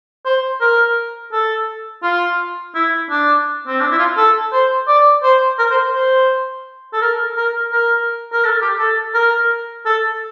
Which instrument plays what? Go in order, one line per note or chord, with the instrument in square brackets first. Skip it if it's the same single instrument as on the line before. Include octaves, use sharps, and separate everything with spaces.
[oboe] C5
A#4
A4
F4
E4
D4
C4
D4
E4
F4
A4
C5
D5
C5
A#4
C5
C5
A4
A#4
A#4
A#4
A#4
A4
G4
A4
A#4
A4